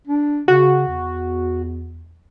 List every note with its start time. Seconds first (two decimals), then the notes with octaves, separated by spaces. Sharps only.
0.07 D4
0.48 C#3 F#4
0.88 E2